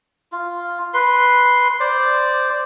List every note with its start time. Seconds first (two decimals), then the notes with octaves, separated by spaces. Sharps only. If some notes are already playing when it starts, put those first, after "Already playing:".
0.32 F4
0.94 B4 C6
1.80 C5 D5